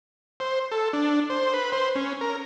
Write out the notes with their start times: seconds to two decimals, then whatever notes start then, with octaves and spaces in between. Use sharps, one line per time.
0.40 C5
0.72 A4
0.93 D4
1.30 C5
1.54 B4
1.72 C5
1.95 C#4
2.21 A#4